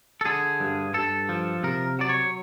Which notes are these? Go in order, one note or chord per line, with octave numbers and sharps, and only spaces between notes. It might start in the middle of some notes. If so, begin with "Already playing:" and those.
A4
D3 G#4
G2
G2 A4
F3
C3 A#4
F#3 D5
C#5